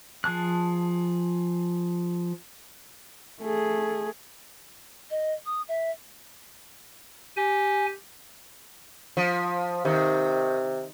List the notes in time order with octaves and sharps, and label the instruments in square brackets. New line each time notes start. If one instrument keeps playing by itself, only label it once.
[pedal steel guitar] F3 G#4 A5 F#6
[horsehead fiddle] A3 G#4
[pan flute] D#5
D#6
E5
[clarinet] G4 [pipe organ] G#5
[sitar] F3
[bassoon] C3 [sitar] D#3